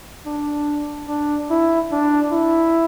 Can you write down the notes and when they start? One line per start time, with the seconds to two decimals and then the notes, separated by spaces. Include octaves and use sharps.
0.26 D4
1.08 D4
1.50 E4
1.92 D4
2.32 E4